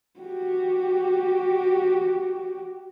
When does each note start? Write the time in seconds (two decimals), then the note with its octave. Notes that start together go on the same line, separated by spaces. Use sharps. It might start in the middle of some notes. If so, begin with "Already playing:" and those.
0.20 F#4 G4